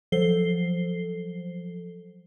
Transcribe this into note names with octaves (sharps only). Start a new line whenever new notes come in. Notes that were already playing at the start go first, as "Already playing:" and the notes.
F3 F#3 A4 C5 C7 G7